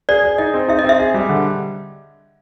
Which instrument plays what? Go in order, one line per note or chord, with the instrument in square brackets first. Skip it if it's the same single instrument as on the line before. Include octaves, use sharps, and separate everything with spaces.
[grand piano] G#4 [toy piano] D5
[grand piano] G#4
[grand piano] D#4 [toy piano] D#5
[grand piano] C4
[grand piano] D#4 [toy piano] E5
[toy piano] D#5
[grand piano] C4 [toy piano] E5
[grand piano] G#4
G3
D3